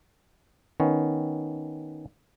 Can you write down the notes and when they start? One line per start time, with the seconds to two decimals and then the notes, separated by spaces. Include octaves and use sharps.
0.80 D#3 B3 C#4